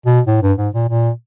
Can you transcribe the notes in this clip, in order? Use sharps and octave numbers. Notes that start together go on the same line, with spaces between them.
B2
A2
G2
G#2
A#2
A#2